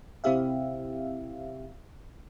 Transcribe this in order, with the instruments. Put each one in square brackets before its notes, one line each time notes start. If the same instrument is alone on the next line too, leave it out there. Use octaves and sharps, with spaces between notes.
[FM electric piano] C3 C4 E4 G4 E5 F5